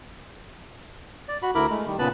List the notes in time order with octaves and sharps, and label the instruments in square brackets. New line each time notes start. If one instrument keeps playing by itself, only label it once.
[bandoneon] D5
F#4 B5
D2 E4 A#4 B5 D6
G#3 A3
D#3 G3
A#2 C#3 B3 B4 A5 B5